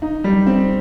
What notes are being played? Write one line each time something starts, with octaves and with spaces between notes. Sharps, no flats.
D#4
G3
C4